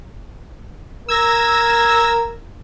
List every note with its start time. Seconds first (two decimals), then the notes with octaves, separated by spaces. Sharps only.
1.08 A#4 E6 G#6 A#6